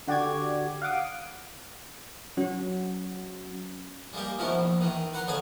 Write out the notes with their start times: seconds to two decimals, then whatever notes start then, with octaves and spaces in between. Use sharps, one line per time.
0.08 D3 F#4 G4 D5 D6 G#6
0.82 F5 F#5 D6 D#6
2.37 F#3 C#4 F#4
4.13 G3 G#3 A#3 G4
4.38 D#3 F3 G#3 B3 C#4 E4
4.58 A#1
4.81 D#3 E3
5.14 B4 F#5 A#5 C6
5.28 D2 C#3 B3 G#4 G#5 A5